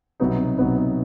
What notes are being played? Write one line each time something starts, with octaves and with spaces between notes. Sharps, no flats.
C2 B2 F#3 B3 D#4
C2 B2 F#3 B3 D#4